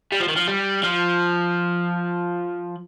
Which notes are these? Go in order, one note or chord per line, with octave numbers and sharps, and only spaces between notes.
G3
F3
D#3
F3
G3
F3